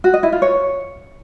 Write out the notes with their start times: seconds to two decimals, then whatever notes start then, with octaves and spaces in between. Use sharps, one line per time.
0.04 F#4
0.14 D#5
0.23 E4
0.32 F4
0.42 C#5